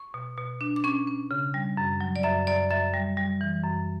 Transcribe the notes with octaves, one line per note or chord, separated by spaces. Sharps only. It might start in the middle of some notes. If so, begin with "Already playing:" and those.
Already playing: C#6
B2
B2
D4
D6
C#4 C#6
C#4
C#3
G3
F#2
F#3
D5
F#2 E5
F#2 D5
F#2 E5
G3
G3
E3
F#2